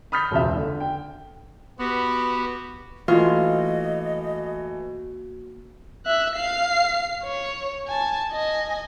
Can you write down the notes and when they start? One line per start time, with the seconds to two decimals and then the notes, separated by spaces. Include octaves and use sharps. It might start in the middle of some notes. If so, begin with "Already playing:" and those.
0.12 B5 D#6 F6 G6 B6
0.31 E1 C#2 E5
0.55 D3
0.80 G5
1.79 B3 F#4 G4 B4
3.08 E3 A3 A#3 F4 F#4 D#5
6.06 E5 F#6
6.36 F5 C7
7.23 C#5
7.87 G#5 A5
8.32 D#5 G#5